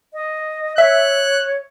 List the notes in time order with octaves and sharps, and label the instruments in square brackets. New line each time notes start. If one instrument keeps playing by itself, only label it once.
[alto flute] D#5
[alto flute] C#5 [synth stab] E5 [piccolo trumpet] F#6